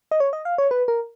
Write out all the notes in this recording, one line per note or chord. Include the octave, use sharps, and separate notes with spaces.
D#5
C#5
D#5
F5
C#5
B4
A#4